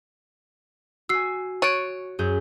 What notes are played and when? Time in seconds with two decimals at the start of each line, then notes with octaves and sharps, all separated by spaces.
1.09 F#4 G#5 E6 C7
1.62 C#5 C#6 F#6 A6 D7 D#7
2.19 F#2 G#4 G6